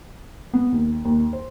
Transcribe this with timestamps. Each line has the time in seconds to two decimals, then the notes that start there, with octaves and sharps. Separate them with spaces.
0.53 B3
0.72 D#2
1.05 D#2
1.33 C5